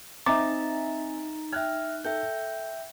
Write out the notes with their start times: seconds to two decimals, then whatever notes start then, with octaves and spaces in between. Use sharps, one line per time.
0.26 C4 D#4 E5 G#5 A#5 D6 A6
1.53 E5 G5 F6 F#6 G#6
2.05 A4 E5 G5 G6